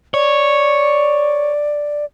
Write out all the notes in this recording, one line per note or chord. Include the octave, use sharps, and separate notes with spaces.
C#5 D5